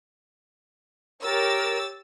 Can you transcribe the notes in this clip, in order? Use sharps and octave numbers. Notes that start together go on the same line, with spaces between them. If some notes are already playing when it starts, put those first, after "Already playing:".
G4 A#4 C#5 E6 A6